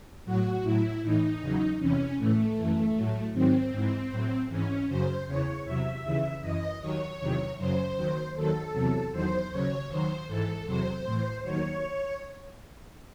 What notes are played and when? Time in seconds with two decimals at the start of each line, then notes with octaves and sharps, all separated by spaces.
0.25 A2 F#3 F#4
0.64 A2 F#3 E4
1.02 A2 E3 D#4
1.42 E2 C#3 F#3
1.80 E2 C3 E3 C#4
2.18 A2 E3 A3
2.57 F#2 E3
2.95 A2 F#3
3.33 G#2 D#3 F#3 C4
3.72 G#2 E3
4.11 A2 F#3
4.49 G#2 E3 C#4
4.88 F#2 C#3 F#3 C5
5.27 E2 C#3 E3 C#5
5.65 E2 C3 F#3 E5
6.04 D#2 C#3 E3
6.42 F#2 E3 D#5
6.81 D#2 D#3 F#3 C#5
7.19 E2 C3 D#3 F#3
7.58 F#2 C#3 F#3 C5
7.96 D#2 D#3 F#3
8.35 D#2 D#3 F#3 A4
8.73 E2 C3 F#3
9.12 E2 D#3 F#3 C5
9.51 D#2 C#3 F#3 C#5
9.89 D#2 D#3 F#3 C5
10.28 G#2 E3 A4
10.66 E2 C3 F#3 C5
11.05 A2 E3
11.44 D#2 D#3 F#3 C#5